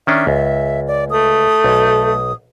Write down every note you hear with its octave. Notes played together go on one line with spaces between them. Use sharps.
D#3 C#4 D4 E5
C#2
D5
A3 D#6
B1